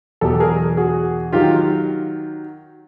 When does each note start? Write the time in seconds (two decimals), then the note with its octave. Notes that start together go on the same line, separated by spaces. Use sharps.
0.21 E2 B2 F#3 G4 A4
0.40 G#4 A#4
0.77 F#4 G#4
1.32 D#3 F#3 F4 G4